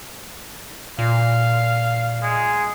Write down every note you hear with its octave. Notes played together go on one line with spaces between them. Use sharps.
A#2 F5
G#3